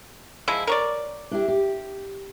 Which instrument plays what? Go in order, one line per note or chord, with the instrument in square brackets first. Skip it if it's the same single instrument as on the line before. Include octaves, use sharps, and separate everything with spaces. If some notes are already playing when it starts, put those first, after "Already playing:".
[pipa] F3 G#3 E4
A#4 C#5 D5
[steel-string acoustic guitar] D4 E4 G4
G4